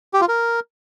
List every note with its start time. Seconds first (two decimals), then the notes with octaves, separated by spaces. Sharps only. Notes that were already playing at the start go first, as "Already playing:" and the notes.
0.14 G4
0.21 F4
0.28 A#4